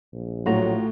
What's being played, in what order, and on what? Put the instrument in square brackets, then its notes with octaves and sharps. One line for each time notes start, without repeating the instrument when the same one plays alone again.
[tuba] A#1
[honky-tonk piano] A2 [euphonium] F#3 [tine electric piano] F4 F#4 A#5